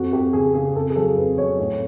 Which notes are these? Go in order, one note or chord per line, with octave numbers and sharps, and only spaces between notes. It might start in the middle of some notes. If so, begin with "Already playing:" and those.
Already playing: F2 F#4
F2 G4
C#3 G#4
C#3 G#4
F2 A4
G#4
F#3 A4
F2 B4
F#3 C#5
A2 C#5